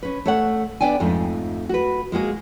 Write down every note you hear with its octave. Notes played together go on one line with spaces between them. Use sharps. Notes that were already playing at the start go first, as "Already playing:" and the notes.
C#4 B4
A3 C#5 F#5
B3 D4 D5 G5 G#5
F2 G#2 A3
F#4 B4
G#3 A#3 F#4 G#4